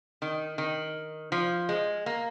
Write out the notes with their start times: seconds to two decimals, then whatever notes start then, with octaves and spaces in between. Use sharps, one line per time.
0.22 D#3
0.58 D#3
1.32 F3
1.69 G#3
2.06 A#3